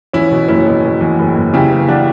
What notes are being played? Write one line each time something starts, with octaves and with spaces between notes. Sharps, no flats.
E2 C#4 E4
B2
F#1 C#4 E4
B2
B2
E2
F#1
F#1
C#3 E4 G4
E3
E3 D4 F#4